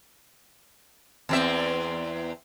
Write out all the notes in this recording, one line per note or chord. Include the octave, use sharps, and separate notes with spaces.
E2 C4 E5